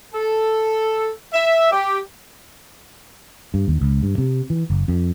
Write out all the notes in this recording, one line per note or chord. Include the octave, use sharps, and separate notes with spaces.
A4
E5
G4
G2
D#2
C#2
G2
C3
E3
F#1
F2